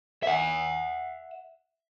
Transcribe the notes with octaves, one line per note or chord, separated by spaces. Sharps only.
E5 F#5